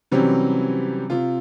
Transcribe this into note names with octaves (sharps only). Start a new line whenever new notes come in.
C3 E3 F#3 G3 C4 C#4
C3 F4